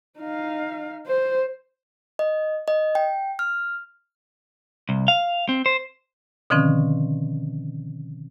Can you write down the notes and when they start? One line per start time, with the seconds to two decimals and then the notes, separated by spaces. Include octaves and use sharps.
0.19 D#4 F5
1.07 C5
2.19 D#5
2.68 D#5
2.95 G5
3.39 F6
4.89 C2
5.08 F5
5.49 C4
5.66 C5
6.50 B2 D3 D#3 F3 C4 C#4